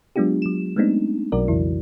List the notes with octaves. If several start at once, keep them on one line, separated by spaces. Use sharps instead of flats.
F#3 G#3 B3 D4 F4 G4
F#3 E7
G#3 A3 B3 C4 D4 D#4
B1 B2 F#3 F#4 A#4 D5
F2 C#3 E3 E4